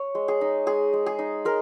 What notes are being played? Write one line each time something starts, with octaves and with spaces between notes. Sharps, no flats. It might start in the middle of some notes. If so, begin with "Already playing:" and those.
Already playing: C#5
G#3
G#4
D#4
G#3 G#4
G#3
G#4
D#4
G#3 A#4